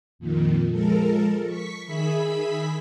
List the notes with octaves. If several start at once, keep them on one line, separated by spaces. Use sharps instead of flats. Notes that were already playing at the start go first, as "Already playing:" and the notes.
F2 A#2 D#3
F3 G#3 A4 A#4
C#6 B6
D#3 G#4 E5 B5 B6